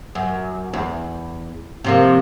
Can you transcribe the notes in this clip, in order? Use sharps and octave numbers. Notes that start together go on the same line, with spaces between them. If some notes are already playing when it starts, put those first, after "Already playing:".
F#2
E2
C3 F3 A#3